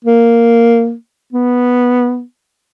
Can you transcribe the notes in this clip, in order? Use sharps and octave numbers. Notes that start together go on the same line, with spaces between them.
A#3
B3